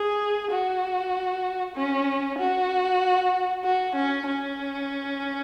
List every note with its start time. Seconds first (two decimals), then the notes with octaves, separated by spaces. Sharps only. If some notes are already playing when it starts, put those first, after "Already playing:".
Already playing: G#4
0.50 F#4
1.75 C#4
2.38 F#4
3.64 F#4
3.95 C#4
4.26 C#4